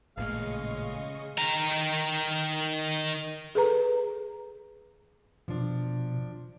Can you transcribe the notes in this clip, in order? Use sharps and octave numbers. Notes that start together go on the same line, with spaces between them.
A1 A#2 C#3 G#3 A3 D#5 F5 C#6
D#3 A#5
G#4 A4 B4 A#5
B2 F3 D4